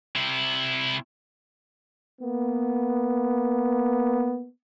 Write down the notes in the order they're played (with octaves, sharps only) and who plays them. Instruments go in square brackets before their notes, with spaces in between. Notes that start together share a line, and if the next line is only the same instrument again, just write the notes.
[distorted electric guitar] C3 E4
[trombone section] A#3 B3